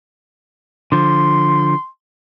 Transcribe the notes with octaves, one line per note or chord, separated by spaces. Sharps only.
D3 F3 C6